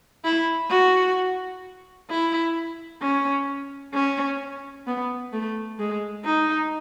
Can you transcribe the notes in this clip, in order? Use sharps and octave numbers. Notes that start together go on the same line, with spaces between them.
E4
F#4
E4
C#4
C#4
B3
A3
G#3
D#4